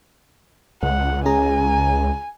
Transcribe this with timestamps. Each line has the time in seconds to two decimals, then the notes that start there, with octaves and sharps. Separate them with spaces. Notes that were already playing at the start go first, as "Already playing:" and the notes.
0.83 C#2 F#5
1.26 C#4 G#4 G#5 A#5